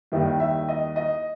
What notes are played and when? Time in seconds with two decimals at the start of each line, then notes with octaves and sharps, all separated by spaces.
0.12 D#2 D#3 G3 E5
0.40 E5
0.69 D#5
0.96 D#5